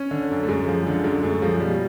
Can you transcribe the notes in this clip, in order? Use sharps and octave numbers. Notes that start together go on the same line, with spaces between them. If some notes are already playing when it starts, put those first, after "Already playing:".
Already playing: C#4
D3
F#2
A3
F#2 G#3
F3
D3
F#2 G#3
F#2 A3
F3 G#3
B2 G3